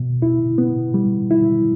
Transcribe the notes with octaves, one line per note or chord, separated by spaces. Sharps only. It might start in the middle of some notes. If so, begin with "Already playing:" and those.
Already playing: B2
E4
B3
G3
E4